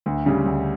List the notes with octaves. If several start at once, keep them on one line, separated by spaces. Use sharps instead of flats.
D2
C#3 G3
D2